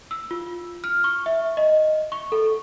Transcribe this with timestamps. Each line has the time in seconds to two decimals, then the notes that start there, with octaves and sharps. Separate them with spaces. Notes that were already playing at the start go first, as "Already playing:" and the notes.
0.11 E6
0.31 F4
0.84 F6
1.04 C#6
1.26 E5
1.57 D#5
2.12 C#6
2.32 A4